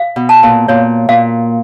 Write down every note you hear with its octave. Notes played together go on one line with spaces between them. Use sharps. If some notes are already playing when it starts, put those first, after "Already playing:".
Already playing: F5
B2
A5
A#2
A#2 C#5
A#2 F5